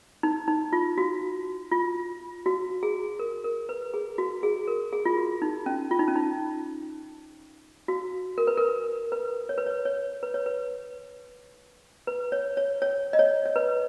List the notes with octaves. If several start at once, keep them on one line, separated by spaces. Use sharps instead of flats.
D#4
D#4
F4
F#4
F4
F#4
G#4
A#4
A#4
B4
G#4
F#4
G#4
A#4
G#4
F4
F#4
D#4
C#4
F4
D#4
C#4
D#4
F#4
A#4
B4
A#4
B4
C#5
B4
C#5
C#5
B4
C#5
B4
B4
C#5
C#5
C#5
D#5
C#5
C#5
B4